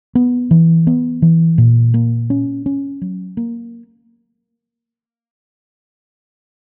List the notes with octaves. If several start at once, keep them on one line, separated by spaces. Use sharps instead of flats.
B3
E3
B3
E3
A#2
A#3
C#4
C#4
F#3
A#3